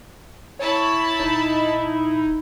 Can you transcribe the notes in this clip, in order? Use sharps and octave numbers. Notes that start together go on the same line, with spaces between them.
E4 C#5 A5 B5
D#1 D#4